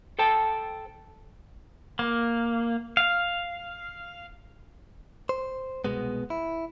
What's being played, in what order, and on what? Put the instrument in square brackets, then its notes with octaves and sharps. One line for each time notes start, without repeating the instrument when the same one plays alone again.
[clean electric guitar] A4 C5 G5 A5
[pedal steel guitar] A#3
F5
[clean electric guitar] C5
C2 F#2 B2 G#3 B3
E4